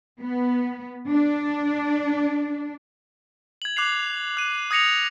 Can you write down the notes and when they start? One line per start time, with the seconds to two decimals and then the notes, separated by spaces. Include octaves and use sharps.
0.22 B3
1.09 D4
3.62 G#6 F#7
3.76 D6 F#6 G#6 C7 F7
4.37 F#6 D#7
4.71 D#6 G#6 A#6 C#7 F7